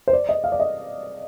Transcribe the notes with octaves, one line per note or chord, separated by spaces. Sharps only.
C5
D5
D#5
F5
D5
D#5